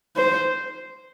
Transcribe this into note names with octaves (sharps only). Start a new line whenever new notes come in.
C5